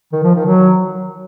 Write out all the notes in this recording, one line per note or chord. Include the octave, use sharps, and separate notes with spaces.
D#3
F3
D#3
F#3